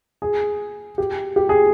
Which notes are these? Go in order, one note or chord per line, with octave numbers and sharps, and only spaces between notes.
G#4
G4
G4
G#4